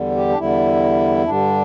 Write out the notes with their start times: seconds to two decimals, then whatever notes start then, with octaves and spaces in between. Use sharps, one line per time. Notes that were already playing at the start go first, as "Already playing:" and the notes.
Already playing: E2 D3 G3
0.16 G4
0.29 D4
0.37 E2 D3 G3 E4
1.25 G2 D3 G3 D4